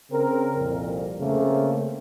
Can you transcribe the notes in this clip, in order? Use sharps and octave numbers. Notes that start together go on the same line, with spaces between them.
C#3 C4 A#4
C2 F2 A#2
C#3 A3 A#3 C4